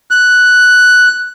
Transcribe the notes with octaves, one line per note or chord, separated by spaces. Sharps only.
F#6